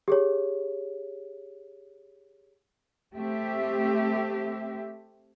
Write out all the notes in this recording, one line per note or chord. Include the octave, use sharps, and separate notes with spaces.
G4 G#4 C#5
A3 C4 G4 E5